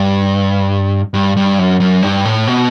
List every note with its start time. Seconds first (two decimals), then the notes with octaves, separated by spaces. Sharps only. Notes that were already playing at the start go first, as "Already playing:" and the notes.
Already playing: G2
1.14 G2
1.37 G2
1.59 F#2
1.80 F#2
2.02 G2
2.25 A2
2.47 B2